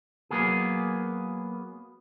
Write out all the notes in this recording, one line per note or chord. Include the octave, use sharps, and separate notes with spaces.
F#3 A#3 B3 G#4